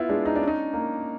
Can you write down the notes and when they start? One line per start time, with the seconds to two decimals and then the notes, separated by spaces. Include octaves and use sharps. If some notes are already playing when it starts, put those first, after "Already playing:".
Already playing: B3 E4 F4
0.09 G#3 D4
0.25 D#4
0.36 D4
0.41 C#4
0.48 D#4
0.73 A#3